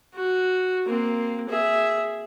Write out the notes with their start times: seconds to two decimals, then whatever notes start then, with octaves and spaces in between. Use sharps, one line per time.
0.15 F#4
0.86 A#3 C4
1.49 G#4 E5